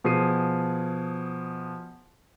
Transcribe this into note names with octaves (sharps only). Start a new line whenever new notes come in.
B2 F3 G#4 C7 D#7